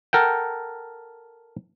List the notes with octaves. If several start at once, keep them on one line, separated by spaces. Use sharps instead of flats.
A4 A#4 F#5 G5